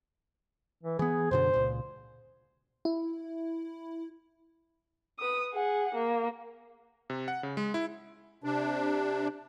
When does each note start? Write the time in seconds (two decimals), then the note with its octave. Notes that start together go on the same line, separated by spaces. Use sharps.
0.84 E3
0.99 E3 B3 G#4
1.31 F#2 B2 D3 C5
1.54 C#2 A#2
2.85 E4
5.19 B4 D#6
5.54 G#4 F#5
5.95 A#3
7.10 C3
7.28 F#5
7.43 C#3
7.57 G#3
7.74 E4
8.44 C3 D4